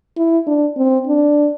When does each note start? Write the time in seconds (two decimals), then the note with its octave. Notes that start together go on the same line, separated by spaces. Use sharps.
0.17 E4
0.47 D4
0.77 C4
1.07 D4